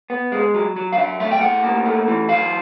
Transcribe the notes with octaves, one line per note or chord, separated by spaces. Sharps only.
B3
G#3
F#3
F#3
F5
F#3 E5
A3 E5
G5
A2 F#5
A#3
A3
E3
F#3 F5